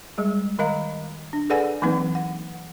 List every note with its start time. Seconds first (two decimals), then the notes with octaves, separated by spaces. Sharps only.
0.18 G3 G#3 G#4
0.59 D#3 A#4 D#5 F5 A#5
1.33 D4
1.50 G#4 A4 B4 D5 F#5 G#5
1.82 E3 F#3 A#3 C4 D#4 B4
2.15 F#5